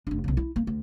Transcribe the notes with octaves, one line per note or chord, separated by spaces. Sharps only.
F1 D4
B1 C#3
E4
A#3
D2